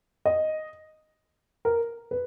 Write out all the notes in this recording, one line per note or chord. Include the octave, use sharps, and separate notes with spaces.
D#5
A#4
B4